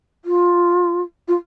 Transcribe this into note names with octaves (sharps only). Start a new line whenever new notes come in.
F4
F4